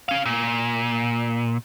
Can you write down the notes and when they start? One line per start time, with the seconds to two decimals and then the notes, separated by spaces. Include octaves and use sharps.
0.09 C#4 F5
0.26 A#2